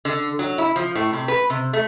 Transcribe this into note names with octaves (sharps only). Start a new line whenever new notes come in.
D3
F#3
E4
F3
A2
C3
B4
C3
A3